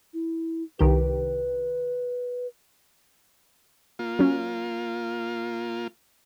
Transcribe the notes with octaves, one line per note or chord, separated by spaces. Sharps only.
E4
C2 D#3 G4 B4
A#3 F4
F#3 C#4